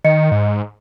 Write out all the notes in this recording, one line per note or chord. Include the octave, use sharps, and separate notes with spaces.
D#3 D#5 C#7
G#2